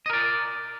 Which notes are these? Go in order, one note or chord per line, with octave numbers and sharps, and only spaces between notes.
A#4 D5 D#5